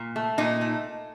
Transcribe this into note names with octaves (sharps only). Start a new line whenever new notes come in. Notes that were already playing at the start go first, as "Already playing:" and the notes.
Already playing: A#2
A3
A#2 D#4
A3